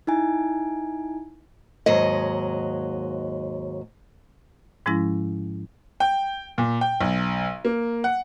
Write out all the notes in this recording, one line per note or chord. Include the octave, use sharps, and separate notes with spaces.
D#4 E4 G#5
D#2 G#2 F#3 D#5
G#2 F3 G#3 C#4 E4 A#6
G5
A#2
G5
B1
A#3
F#5